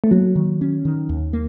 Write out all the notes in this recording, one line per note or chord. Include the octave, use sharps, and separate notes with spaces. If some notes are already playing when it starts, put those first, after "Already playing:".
A3
F#3 A#3
D#3
C#4
D#3
D#2
A#3